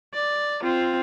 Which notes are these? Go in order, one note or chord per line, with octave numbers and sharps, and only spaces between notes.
D5
C4 F4